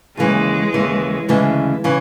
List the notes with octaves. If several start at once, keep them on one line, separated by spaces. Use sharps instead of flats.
D#2 C#3 E3 G#3
D#2 C#3 E3
D2 C#3 E3 G#3
C#3 E3